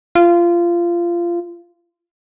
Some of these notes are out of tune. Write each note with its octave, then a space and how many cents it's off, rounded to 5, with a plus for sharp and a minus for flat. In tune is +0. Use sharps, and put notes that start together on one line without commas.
F4 -20